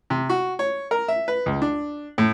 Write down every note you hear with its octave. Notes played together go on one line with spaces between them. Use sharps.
C3
F#4
C#5
A#4
E5
B4
C#2
D4
A2